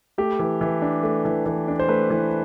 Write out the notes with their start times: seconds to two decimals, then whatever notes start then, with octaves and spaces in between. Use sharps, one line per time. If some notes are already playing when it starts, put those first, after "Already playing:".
0.18 A3 G4
0.39 E3
0.61 E3
0.82 D4
1.03 A3
1.25 E3
1.46 E3
1.68 D4
1.79 C5
1.88 A3 B4
2.10 E3